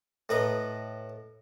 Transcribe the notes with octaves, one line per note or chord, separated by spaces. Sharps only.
A2 B4 D#5 A#5